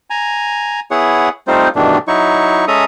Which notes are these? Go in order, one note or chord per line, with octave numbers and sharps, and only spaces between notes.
G#5 A#5
B3 E4 G#4 C#5 F#5
G3 A3 C4 D#4 F4 C5
G2 B2 D#3 E3 A3 D4
F#3 D#4 E4 C#6
G#3 C#4 A4 E5 A#5 D#6